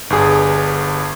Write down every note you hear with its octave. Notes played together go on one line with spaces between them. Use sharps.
G1 G2 G#4